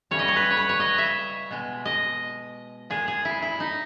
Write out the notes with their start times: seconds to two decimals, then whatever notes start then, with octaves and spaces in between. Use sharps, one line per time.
0.11 C#3 E3 G3 C#5
0.19 D#5
0.28 C#5
0.36 B4
0.50 C#5
0.57 B4
0.69 C#5
0.80 D#5
0.98 E5
1.51 B2 G#3
1.85 D#5
2.90 A#2 G#3 G#4
3.08 G#4
3.25 E4
3.42 E4
3.60 D#4